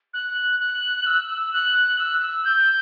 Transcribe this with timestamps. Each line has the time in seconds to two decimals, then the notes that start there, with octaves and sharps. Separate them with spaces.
0.14 F#6
0.60 F#6
1.07 E6
1.53 F#6
1.99 E6
2.22 E6
2.45 G6